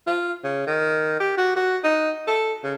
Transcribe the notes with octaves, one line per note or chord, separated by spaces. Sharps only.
F4
C#3
D#3
G4
F#4
F#4
D#4
A4
C#3